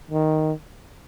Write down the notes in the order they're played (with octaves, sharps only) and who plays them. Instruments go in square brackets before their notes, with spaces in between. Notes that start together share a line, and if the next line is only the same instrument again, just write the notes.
[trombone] D#3